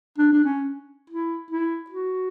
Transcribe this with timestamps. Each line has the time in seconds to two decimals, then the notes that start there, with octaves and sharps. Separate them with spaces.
0.18 D4
0.33 D4
0.45 C#4
1.10 E4
1.51 E4
1.90 F#4